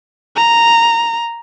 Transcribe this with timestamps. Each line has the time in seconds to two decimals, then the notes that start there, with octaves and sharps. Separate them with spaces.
0.36 A#5